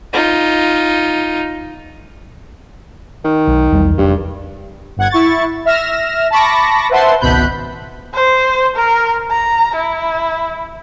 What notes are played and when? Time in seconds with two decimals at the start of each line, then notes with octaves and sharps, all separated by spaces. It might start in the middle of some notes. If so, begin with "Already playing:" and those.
0.13 D#4 F4
3.24 D#3
3.47 B1
3.72 B1 E2 G3
3.98 F1 G2
4.97 G1 F#5 G#6
5.10 E4 C#6 A6
5.65 E5 F6 A#6 E7
6.30 A5 B5 C#6 D6 A#6
6.89 B4 C5 E5 F#5 A5 C6
7.20 G#1 C#2 B2 B5 F#6 G6
8.14 C5
8.76 A#4
9.31 A#5
9.76 E4